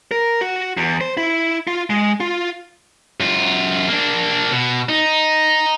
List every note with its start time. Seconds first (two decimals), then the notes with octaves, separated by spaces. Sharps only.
0.11 A#4
0.41 F#4
0.77 E2
1.01 C5
1.17 E4
1.67 F4
1.90 G#3
2.20 F4
3.20 F#2 F4
3.88 A#3 D4
4.52 B2
4.89 D#4